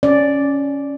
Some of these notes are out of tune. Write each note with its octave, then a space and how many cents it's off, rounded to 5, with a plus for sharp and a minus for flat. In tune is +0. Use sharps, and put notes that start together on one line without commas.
C#4 +5 D5 +0